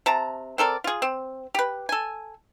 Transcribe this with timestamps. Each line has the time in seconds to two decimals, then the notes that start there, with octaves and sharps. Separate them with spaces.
0.06 C3 A5 A#5
0.58 C4 A4 A#4 D5
0.84 F4 G#4
1.02 C4
1.55 G4 B4
1.89 A4 G#5